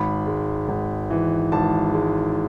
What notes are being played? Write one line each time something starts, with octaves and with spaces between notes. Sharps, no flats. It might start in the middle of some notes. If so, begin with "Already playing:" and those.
Already playing: G#1 B5
G#3
G#1
E3
G#1 A5
G#3